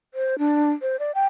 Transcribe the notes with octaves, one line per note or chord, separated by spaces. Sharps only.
C5
D4
C5
D5
G5